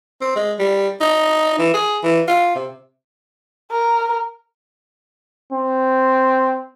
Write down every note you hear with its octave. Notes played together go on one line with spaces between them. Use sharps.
C4
G#3
G3
D#4
E3
G#4
E3
F4
C3
A#4
C4